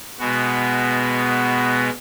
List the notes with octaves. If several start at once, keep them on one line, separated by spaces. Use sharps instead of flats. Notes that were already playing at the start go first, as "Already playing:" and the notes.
B2 G#3 B3 F#4